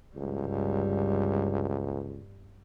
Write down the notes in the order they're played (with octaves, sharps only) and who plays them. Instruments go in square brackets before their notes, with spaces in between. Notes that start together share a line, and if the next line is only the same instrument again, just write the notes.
[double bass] G1 G3 [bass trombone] C#2